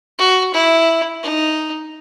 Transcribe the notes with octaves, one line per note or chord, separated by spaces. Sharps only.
F#4
E4
D#4